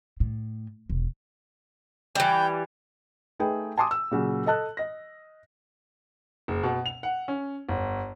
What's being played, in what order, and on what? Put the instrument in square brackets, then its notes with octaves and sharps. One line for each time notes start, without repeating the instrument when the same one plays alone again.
[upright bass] A2
E1
[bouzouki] E3 G3 [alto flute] G5
[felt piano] A3 D#4 G#4 A4 B4 G5
G#5 A5 C6 D6 D#6
E6
A#2 C#3 F#3
A4 D#5 A5 F#6
D#5 A#6
[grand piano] F#1
B2
F7
F#5
C#4
G1